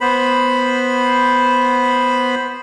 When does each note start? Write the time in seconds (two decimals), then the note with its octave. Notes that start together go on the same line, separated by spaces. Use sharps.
0.01 B3 C5 B5